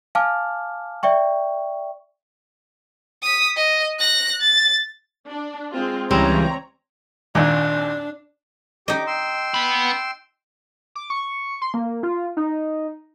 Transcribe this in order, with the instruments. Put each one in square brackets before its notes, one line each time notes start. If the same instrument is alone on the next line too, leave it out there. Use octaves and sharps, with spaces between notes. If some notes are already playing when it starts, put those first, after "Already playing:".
[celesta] F5 G#5 A5 D6 F6
D5 E5 G5 C#6
[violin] D#6 B6
D#5
F#6 A#6
A6
[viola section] D4
G#3 C4 F4
[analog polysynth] C#2 C#3 E3 [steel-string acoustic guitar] G3 [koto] C4 [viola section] C#5 A#5
[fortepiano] G#1 D#2 A#2 [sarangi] D4
[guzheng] D#4 D#5 [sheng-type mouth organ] G4 D6
[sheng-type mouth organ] G5 C6 E6
[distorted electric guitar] B3 B5
[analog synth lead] D6
C#6
C6
A#3
F4
D#4